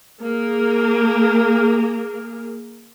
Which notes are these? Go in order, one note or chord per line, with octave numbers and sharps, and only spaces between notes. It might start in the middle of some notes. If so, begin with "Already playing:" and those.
A#3 G#4 A#4